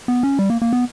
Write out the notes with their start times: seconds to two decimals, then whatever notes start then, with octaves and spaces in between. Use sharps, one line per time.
0.08 B3
0.23 C#4
0.39 G3
0.50 A#3
0.62 A#3
0.73 B3